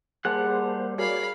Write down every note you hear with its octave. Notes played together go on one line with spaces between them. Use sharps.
G3 A#3 G#4 C5 F#5 A5 F#6
F#4 G#4 A#4 C#5 D5 F5 B5